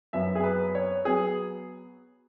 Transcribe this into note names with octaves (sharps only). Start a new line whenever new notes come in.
F#2 F#3 B3 E5
G#4
B4
C#5
F#3 B3 G#4